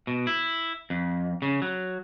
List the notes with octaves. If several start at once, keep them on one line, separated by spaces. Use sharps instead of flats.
B2
E4
F2
C#3
F#3